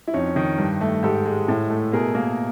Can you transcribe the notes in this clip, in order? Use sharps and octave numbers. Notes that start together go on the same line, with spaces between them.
E4
F2 C#4 D#4
D#3
G2
A3
G#2 G4 A4
G#3
A2
A3
B2 G#4 A#4
A#3